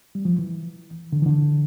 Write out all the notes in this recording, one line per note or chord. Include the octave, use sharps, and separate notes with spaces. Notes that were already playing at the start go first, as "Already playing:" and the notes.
G3
F3
E3
D3
E3
D3